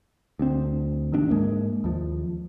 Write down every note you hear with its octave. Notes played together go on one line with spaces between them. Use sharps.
D2 C4
D1 A1 D#2 D4
G#2 G#3 A#3
D#2 F3